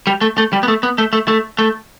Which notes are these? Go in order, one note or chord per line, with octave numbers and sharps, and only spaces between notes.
G3
A3
A3
G3
B3
A3
B3
A3
A3
A3
A3